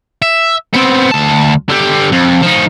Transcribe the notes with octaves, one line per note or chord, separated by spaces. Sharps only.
E5
B3 C4
D2 A5
D3 G4
F2
F3 D#4